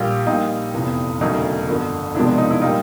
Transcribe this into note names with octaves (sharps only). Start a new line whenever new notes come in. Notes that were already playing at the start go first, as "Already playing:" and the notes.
Already playing: A#1 A#2 G3 F4 G4
A#1 A#2 G3 D#4 F4
F1 E2 C3 E3
E1 D2 C#3 F#3 D#4
G1 F2 D3
E1 E2 C3 F3 G#3 D4 E4
D4
D#4
D4 E4
A#2 G3 D#4 F4